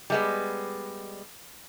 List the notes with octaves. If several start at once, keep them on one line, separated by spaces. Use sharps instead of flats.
G3 G#3 B3